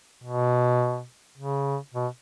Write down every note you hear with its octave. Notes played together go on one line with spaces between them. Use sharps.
B2
C#3
B2